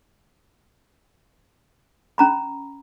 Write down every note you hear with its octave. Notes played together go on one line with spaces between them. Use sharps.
C#4 A#5 B5